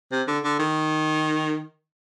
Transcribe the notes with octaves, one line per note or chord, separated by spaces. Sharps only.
C3
D3
D3
D#3